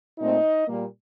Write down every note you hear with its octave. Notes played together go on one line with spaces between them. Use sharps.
A#2 A3 C4 D#4 D#5
A#2 G3 A#3